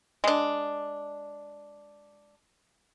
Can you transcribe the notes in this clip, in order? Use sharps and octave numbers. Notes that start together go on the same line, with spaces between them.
G#3 D4